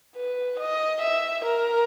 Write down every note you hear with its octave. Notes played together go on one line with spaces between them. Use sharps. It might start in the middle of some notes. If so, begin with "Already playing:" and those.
B4
D#5
E5
A#4